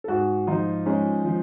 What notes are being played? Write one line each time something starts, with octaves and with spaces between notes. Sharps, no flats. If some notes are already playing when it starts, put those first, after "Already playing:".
A4
G#2 F#4 G#4
F3 D#4 F4
G#3 C#4 D#4
F3